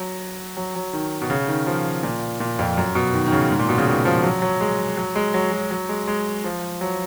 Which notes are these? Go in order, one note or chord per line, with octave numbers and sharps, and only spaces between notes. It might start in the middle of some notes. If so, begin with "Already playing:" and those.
Already playing: F#3
F#3
F#3
D#3
B2
C#3
D#3
F3
A#2
A#2
F2
F#2
B2
D#3
D#3
C#3
G#2
A#2
B2
C#3
D#3
F3
F#3
F#3
G#3
F#3
G#3
F#3
F#3
F#3
G#3
G#3
F3
F#3